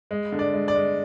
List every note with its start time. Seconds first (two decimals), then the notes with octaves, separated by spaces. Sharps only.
0.11 G#3
0.32 D3
0.39 D5
0.54 G#3
0.68 D5
0.75 G#3